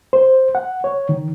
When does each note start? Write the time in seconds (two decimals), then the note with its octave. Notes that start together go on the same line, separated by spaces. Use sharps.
0.13 C5
0.55 F#5
0.84 C#5
1.09 D#3